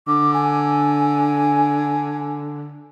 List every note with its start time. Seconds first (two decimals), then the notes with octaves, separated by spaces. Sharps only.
0.07 D3 D6
0.34 G#5